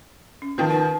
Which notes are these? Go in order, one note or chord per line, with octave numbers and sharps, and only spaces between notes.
C#4
D#3 F3 B4 G5 A5
D#4 B4 A5